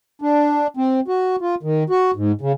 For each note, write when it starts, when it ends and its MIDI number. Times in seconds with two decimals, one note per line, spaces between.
0.22 0.67 62
0.77 1.00 60
1.08 1.36 66
1.41 1.55 65
1.63 1.84 51
1.90 2.11 66
2.16 2.32 44
2.41 2.52 49